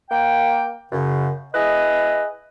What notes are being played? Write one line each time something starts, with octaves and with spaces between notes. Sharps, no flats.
A#3 G5
F#2 C#3
E4 G#4 B4 D#5